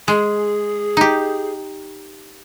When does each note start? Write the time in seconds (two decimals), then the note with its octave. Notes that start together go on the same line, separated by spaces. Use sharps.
0.08 G#3 G#4
0.97 D#4 G4